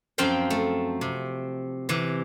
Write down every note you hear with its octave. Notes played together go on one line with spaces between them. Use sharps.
F#2 F3 C4 F4 F5 G5
A3
C3
C3 E3